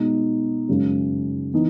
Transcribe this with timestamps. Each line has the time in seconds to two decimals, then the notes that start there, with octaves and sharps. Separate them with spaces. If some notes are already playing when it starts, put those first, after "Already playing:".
Already playing: B2 G#3 D#4
0.68 F#2 C#3 G#3
1.53 E3 B3 D#4